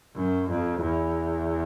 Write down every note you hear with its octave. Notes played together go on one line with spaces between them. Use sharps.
F#2
F2
E2